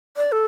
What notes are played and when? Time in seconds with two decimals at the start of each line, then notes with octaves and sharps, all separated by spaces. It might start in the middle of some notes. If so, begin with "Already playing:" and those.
0.17 D5
0.32 A4